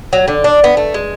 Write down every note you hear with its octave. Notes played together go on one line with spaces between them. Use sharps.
F#3
D3
D4
B3
A3
G#3